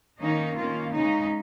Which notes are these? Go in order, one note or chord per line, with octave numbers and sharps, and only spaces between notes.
D#3 A#3 C#4 D#4
D#3 A#3 C#4 F4
C#3 G#3 C#4 D#4